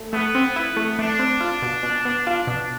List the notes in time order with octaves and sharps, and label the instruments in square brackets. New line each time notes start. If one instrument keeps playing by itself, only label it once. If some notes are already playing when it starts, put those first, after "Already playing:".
Already playing: [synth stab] A3
[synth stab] A3 [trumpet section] B3
[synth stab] C4
[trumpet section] B3 [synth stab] E4
[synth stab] A3
[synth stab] A3 [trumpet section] D4
[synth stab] C4
F4
B2
B2
B3
F4
B2